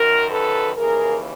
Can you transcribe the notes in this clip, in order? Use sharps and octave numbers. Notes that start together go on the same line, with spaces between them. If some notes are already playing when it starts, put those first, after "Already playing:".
Already playing: F#2 D#3 A#4
A4 B4
D#2 C#3 E3 G#4 A#4